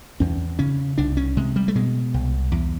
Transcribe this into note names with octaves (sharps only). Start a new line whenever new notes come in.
E2 C#4
C#3 C#4
C2 D4
C#4
C3 G#3
G3
A3
B2 G#3
C2
E2